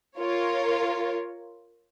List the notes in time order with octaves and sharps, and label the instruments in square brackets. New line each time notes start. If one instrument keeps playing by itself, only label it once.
[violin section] F4 A#4 C#5